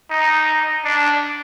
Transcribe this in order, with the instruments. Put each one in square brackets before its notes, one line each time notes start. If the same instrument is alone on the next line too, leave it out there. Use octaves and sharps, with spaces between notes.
[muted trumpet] D#4
D4